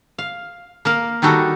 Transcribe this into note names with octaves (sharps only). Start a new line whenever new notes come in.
F5
A#3 A#4 F5
D#3 G3 D#4 F#4 A4